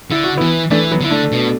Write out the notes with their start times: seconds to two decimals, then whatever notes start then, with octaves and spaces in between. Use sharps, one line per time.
0.11 D3 E4
0.24 F#4
0.37 E3 B3 E4
0.70 E3 A3 D4
0.91 F#3 B3
1.01 D3 E4
1.11 A3 D4
1.32 B2